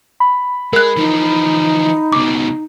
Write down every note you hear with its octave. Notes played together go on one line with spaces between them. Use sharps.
B5
G#3 A#4 F#6
E3 F3 D#4
C#2 B2 D6